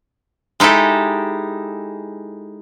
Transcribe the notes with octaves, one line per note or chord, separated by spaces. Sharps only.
G#3 D#4 E4 G4 A4